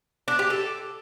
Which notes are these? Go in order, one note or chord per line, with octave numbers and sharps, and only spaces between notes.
D4
G4
A4